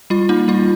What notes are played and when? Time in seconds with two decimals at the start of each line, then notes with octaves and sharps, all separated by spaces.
0.10 G3 F4
0.29 A#3 D#4
0.48 G3 F4